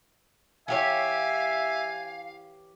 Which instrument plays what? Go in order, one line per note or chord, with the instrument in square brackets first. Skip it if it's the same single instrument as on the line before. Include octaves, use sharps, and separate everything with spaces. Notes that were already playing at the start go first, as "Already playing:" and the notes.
[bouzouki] E3 G4 C#5 [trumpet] E5 [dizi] F5 [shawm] G#5